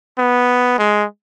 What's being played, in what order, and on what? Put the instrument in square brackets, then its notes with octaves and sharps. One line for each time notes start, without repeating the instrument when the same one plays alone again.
[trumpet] B3
G#3